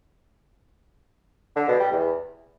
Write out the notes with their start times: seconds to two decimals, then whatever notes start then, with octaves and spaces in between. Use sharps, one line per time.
1.56 D3
1.68 B2
1.80 G3
1.92 E2